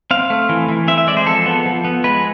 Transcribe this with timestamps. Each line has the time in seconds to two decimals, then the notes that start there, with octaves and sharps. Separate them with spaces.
0.11 C4 F5
0.30 A3
0.49 E3
0.68 E3
0.88 C4 E5
0.98 E5
1.07 G#3 D5
1.17 C5
1.26 F3 A4
1.46 B3
1.65 F3
1.85 B3
2.04 G#3 B4